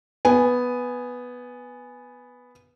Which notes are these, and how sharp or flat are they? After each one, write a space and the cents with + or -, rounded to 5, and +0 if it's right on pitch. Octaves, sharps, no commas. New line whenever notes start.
B3 +0 G#5 +0